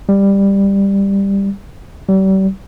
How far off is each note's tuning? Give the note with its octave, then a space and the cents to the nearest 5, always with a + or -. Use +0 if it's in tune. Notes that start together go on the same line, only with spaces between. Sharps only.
G3 +10
G3 -40